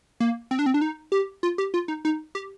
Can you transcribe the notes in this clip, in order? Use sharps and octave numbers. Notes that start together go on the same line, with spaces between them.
A#3
C4
D4
C4
D4
D#4
G4
F4
G4
F4
D#4
D#4
G4